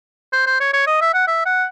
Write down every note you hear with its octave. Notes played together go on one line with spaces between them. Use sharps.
C5
C5
C#5
C#5
D#5
E5
F#5
E5
F#5